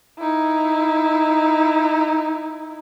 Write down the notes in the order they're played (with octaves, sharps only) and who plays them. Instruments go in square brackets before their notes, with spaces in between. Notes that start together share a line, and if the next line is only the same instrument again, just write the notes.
[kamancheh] D#4 E4